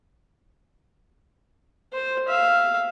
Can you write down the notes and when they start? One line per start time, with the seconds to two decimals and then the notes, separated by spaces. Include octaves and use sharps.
1.93 C5
2.28 E5 F5